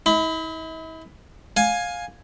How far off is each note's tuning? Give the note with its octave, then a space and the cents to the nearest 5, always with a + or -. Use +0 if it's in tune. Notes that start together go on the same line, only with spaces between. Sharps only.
E4 -45 B5 +15
F5 +20 G#5 +0